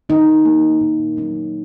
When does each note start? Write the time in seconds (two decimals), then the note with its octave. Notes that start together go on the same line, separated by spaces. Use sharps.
0.09 D#3 D#4
0.45 A#3 C#4
0.81 A#2
1.17 F#3 C#4